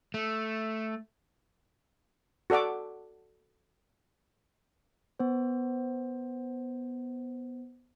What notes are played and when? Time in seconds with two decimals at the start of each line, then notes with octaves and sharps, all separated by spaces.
0.14 A3
2.50 F#4 A4 D5 F#5 D6
5.20 B3 C5